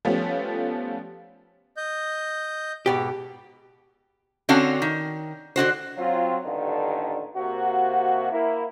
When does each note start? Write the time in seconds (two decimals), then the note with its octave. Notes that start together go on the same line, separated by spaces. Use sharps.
0.05 F3 G3 A3 B3 C#4
1.77 D#5 G6
2.86 G#2 B2 G4
4.49 D3 C4 C#4 F#4 F5 A5
4.82 D#3
5.56 D3 D#4 F#4 C5
5.98 F#3 C4 F4
6.45 A1 G2 A#2 D3 D#3 D4
7.37 C3 A#3 F#4
8.32 A#3 E4